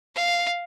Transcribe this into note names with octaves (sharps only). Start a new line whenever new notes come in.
F5